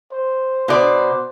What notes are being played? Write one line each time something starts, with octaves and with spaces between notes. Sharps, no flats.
C5
B2 C5 D5